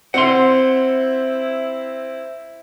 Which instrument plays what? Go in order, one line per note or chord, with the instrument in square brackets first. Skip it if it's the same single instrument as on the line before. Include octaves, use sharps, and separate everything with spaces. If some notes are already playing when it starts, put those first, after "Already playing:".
[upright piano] C4 [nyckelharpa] E4 [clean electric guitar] F#5 C6